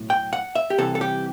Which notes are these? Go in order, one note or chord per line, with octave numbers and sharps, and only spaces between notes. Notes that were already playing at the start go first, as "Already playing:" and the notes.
Already playing: B1 A2 F#3
G5
F#5
E5
G4
C2 C3 E3 A4
A4
G4